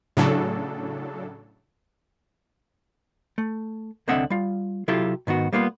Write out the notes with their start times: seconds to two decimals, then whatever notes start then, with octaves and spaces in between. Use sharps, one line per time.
0.17 A2 C#3 F#3 D4 A4
3.38 A3
4.08 C2 D3 C4 D#5 E5 F#5
4.30 G3 F4
4.88 C3 F#3 E4 F4 G4 A4
5.27 G#2 D#3 B3 F#4
5.53 G3 A#3 B3 D4 F4